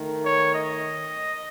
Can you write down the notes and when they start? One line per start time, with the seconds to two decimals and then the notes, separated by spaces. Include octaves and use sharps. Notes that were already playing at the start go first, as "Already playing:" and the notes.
Already playing: D#3 A3
0.25 C#5
0.53 D#5